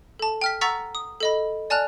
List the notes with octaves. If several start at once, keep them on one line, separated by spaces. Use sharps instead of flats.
A4 A5
G5 F6 B6
F#5 A#5 C#6 E6 A6 B6
D#6
A4 D#5 B5
D5 G#5 A5 F6 F#6 F7